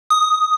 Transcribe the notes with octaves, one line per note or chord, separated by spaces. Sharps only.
D#6